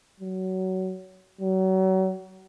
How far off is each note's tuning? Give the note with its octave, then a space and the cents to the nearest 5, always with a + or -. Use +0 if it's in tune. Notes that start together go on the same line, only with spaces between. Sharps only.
F#3 +20
F#3 +35